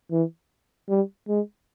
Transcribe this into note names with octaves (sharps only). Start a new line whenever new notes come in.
E3
G3
G#3